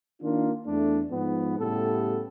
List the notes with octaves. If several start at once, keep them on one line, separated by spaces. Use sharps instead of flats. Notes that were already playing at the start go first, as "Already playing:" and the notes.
D#3 A#3 D4 F4
E2 A3 D4
G#2 F3 B3
A2 C#3 G3 B3 G4 A4